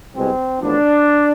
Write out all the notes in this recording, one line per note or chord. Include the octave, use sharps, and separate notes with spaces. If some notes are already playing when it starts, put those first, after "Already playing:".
C2 B2 G#3 C4
A1 A2 F3 B3 D4